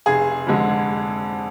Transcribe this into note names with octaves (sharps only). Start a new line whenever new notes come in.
F1 G#4
F2 D3 G#3